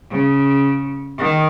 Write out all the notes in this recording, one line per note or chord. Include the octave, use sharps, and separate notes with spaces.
C#3
D#3